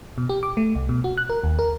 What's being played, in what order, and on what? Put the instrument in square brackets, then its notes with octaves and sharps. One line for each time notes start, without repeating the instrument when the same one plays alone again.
[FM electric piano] B2
G4
D6
A3
C2
B2
F#4
F#6
A#4
D#2
A#4